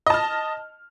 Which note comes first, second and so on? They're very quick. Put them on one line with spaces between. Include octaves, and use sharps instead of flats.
D#5 A5 F6